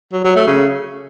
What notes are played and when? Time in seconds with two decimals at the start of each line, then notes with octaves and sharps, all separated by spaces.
0.13 F#3
0.24 F#3
0.36 A3
0.47 C#3